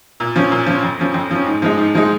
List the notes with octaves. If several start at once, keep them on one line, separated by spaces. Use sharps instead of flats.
A#2
F3 C#4
A#2
F3 C#4
F2
F3 C#4
F2
F3 C#4
G#2
F3 G#3 D#4
G#2
F3 G#3 D#4